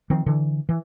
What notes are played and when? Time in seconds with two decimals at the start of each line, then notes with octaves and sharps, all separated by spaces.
0.10 D#3 F3 C4
0.26 D3 E3
0.69 E3